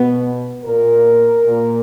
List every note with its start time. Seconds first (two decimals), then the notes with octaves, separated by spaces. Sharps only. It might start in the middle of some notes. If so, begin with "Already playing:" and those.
Already playing: B2 B3
0.65 A#2 A#4
1.47 A#2